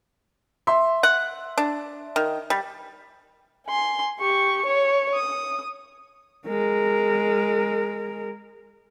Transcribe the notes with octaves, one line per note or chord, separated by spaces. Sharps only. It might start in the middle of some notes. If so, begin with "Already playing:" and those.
E5 C6
F#5
D4
D#3
G3
G#5 C6
G4 C#6
C#5
D#6
G#3 A#4